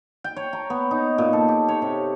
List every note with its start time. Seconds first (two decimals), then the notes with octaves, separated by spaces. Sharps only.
0.24 G5
0.36 C#5
0.53 A#5
0.70 B3
0.91 D#4
1.18 A#2
1.33 A4
1.48 G4
1.68 C#5
1.82 C3